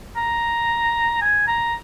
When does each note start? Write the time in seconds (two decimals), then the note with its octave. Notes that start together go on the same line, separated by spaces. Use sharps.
0.17 A#5
1.22 G#5
1.48 A#5